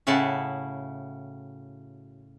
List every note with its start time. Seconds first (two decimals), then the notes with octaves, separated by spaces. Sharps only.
0.07 A2 C#3 E4 F#4 A5